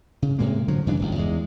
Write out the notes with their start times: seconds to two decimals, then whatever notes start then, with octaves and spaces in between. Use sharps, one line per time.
0.22 C#3
0.38 A2 C3 G#3 A#3
0.68 D3 F3 F#3
0.87 G2 C#3 E3 D4
0.99 G1 C#2
1.16 E2 G#3